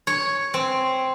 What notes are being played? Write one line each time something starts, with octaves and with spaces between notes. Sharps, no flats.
C#5
C4